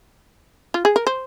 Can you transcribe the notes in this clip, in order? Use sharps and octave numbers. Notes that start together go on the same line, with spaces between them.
F4
G#4
A#4
C5